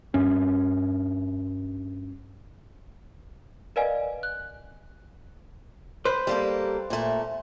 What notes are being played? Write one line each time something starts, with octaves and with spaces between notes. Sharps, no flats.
G2 C#4
A#4 B4 D5 D#5 F5 G#5
F#6
B4 C5
G3 A#3 A4
A#2 A3